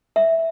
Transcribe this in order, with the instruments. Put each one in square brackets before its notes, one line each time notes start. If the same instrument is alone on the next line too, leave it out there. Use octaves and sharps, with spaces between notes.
[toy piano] E5